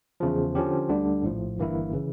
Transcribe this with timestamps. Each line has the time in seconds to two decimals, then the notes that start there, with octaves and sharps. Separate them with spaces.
0.20 E2 C#3 F3
0.55 D3 F3 C#4 G4
0.89 D2 D3 G3 D4
1.23 A#1 A2 F3
1.58 G1 G2 E3 A#3 E4
1.93 C#3 E3